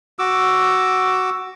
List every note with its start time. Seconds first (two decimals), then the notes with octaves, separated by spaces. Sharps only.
0.19 F#4 D6 E6